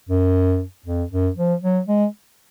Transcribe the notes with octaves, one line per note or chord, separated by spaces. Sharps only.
F#2
F2
F#2
F3
F#3
G#3